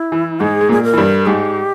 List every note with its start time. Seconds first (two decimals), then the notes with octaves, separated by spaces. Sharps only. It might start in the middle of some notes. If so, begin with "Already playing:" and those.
Already playing: E4
0.12 E3
0.40 G#2 G#3 G#4
0.61 G#3
0.69 A#2 A#3 G#4
0.84 A#4
0.93 E3
0.98 G2 G3
1.26 G#2 G#3 G4